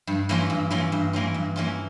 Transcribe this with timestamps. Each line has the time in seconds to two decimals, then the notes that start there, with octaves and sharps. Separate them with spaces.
0.07 G2
0.29 E3 A#3 C#4 F4
0.50 G2
0.70 E3 A#3 C#4 F4
0.92 G2
1.13 E3 A#3 C#4 F4
1.34 G2
1.56 E3 A#3 C#4 F4